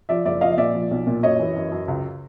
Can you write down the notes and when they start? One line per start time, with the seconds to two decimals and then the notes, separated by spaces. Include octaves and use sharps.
0.09 F3 D5 E5
0.25 F#1 D5 E5
0.41 F3 D#5 F5
0.52 D#5
0.58 A#2 D5 E5
0.74 F3
0.91 B1
1.07 A#2
1.23 F#2 C#5 D#5
1.39 E3
1.56 F#2
1.72 F#2
1.88 C#2